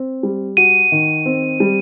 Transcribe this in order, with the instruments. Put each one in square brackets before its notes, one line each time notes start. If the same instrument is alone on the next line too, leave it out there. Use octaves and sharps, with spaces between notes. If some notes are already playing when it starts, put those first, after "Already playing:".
Already playing: [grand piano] C4
G3
[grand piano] F#4 [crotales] D#7
[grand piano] D#3
C4
G3